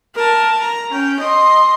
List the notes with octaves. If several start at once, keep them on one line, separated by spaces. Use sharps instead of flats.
A#4 A5
A#5
C#4 G5
D#5 C6